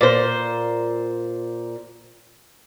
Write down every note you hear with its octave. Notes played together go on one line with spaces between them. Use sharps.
A#2 C5